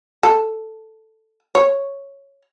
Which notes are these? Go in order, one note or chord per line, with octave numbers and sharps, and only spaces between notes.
A4
C#5